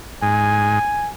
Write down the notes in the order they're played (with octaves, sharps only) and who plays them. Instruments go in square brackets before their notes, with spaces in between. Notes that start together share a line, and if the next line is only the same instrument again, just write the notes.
[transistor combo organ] G#2 [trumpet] G#5